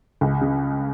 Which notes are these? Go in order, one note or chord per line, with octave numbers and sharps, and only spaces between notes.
C#2
C#3